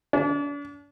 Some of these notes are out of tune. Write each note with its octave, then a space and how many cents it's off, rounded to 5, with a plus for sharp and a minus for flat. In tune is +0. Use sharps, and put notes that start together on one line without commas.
D4 -40